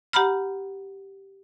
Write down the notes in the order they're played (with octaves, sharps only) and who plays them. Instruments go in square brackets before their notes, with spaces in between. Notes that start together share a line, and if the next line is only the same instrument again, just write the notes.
[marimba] G4 F#5 A#5 B5 F6